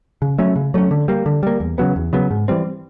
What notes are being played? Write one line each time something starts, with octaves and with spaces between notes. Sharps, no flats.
C#3
F#3 A3 C#4
C#3
F#3 A3 C#4
D3
G3 A#3
D3
G3 A#3
E2
C#3 F#3 B3
E2
C#3 F#3 B3
G#2
E3 G3 C4